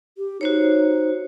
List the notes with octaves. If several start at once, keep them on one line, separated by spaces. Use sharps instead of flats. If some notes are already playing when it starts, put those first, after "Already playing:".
G4
D#4 F#4 C5 C#5